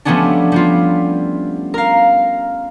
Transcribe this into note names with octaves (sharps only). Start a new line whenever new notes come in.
F3 G3 A3 B3 C#4 D4
G3 B3 F4
A#4 F5